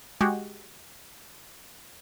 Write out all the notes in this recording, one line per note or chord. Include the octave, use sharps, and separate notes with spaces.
G#3 F#4 G4